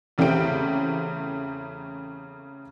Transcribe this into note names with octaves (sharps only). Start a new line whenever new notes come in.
E2 C#3 A3 C4 G4 D7